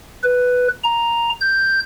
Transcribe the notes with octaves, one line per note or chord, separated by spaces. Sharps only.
B4
A#5
G6